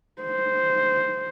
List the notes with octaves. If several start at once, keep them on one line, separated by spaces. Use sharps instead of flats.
C5